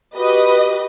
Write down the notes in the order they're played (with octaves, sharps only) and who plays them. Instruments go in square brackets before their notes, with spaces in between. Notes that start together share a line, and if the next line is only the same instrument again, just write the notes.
[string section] F#4 G4 B4 D#5